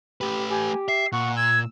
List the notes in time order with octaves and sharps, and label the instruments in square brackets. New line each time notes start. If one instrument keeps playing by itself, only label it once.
[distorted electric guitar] A3 B4 [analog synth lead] G4
[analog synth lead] G4 [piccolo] G#5
[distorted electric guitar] E5 [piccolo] C7
[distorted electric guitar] A#2 [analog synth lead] F#5 [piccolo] C#6
[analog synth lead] E6 [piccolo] G#6